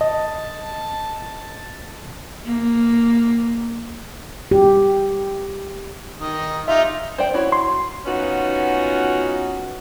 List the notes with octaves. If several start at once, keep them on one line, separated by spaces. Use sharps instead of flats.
D#5 A5
A#3
G4
D#3 D#5
D#4 F4 G4 E5
C5 D5 G5
E4 F#4 C#5
C6
B3 C#4 D#4 F4 F#4